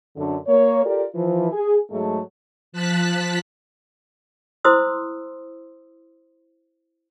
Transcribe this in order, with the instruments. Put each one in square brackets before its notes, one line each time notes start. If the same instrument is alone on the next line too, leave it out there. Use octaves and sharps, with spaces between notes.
[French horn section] F#2 D3
A#3 C#5
F4 G4 A4 A#4 D5
E3 F3
G#4
G#2 F#3 G#3 A3
[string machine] F3 A5 F#6 B6
[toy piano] E4 C5 C6 D#6 E6